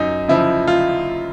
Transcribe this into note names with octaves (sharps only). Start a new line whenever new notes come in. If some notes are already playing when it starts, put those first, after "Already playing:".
Already playing: F#2 D#4
C#3 F3 E4
F4